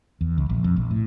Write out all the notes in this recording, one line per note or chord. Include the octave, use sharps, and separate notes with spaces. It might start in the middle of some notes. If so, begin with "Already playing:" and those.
E2
C#2
A#1
F2
A#1
A2